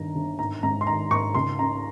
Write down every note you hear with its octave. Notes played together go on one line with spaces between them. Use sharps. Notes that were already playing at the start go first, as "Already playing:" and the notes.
Already playing: G1 G2 D#3 A#5
G1
G#1 A#5
G#2 A#5
C6
D#3 A#5
G#1 C#6
C#2 C6
C#3 A#5